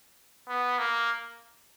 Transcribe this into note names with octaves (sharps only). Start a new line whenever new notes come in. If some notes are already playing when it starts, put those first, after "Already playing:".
B3
A#3